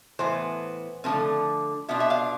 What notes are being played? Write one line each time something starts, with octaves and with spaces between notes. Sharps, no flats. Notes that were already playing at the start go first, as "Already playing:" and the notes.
A2 E3 B3 C5
D3 F3 A3 C4
B2 B3 D4 F4 E5
E5
F5